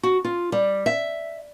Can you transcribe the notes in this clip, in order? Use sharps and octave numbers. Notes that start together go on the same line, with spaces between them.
F#4
F4
G3
E5